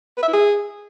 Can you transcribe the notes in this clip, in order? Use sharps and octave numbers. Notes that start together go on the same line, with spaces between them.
B4
E5
E4
G#4